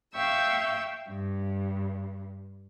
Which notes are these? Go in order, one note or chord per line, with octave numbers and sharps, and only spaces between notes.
E5 F5 G5 C#6 E6 G6
G2